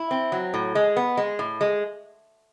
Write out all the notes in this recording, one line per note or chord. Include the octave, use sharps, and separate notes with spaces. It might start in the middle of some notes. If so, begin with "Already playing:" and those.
Already playing: E4
C4
F#3
A2
G#3
B3
G#3
A2
G#3